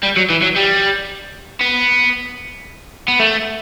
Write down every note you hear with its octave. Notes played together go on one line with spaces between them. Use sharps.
G3
F#3
E3
F#3
G3
B3
B3
A3